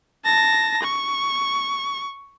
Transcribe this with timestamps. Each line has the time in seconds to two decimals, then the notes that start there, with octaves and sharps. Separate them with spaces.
0.25 A5 A#6
0.83 C#6